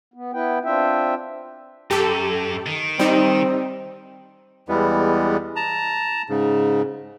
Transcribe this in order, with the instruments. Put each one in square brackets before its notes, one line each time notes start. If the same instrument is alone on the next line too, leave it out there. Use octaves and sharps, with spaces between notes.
[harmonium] B3
B3 E4 B4 G5
C4 D4 F4 E5 G5
[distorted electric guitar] F#2 [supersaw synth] G4 A4
[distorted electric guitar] D#3
[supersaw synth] G3 D#4 [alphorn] C4
[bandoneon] E2 E3 G3 G#3 B3
A5 A#5
G#2 C#3